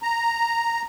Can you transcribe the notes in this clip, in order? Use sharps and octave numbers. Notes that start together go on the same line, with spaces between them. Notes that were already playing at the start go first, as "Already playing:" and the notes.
A#5